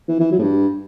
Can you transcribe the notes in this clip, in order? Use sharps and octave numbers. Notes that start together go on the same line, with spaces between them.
E3
E3
F#3
A2
G2